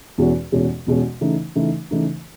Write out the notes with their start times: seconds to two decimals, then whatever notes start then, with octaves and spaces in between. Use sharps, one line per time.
0.18 E2 B2 G#3 C#4 F#4
0.52 E2 B2 G#3 C#4 F#4
0.87 E2 B2 G#3 C#4 F#4
1.21 C#3 E3 A3 D#4
1.56 C#3 E3 A3 D#4
1.91 C#3 E3 A3 D#4